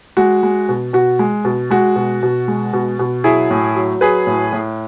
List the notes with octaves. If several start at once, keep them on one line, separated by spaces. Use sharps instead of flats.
G#3 F#4
G#3
B2
B2 F#4
G#3
B2
G#3 F#4
B2
B2
G#3
B2
B2
F#3 E4 G#4
A2
F#3
F#3 G#4 B4
A2
A2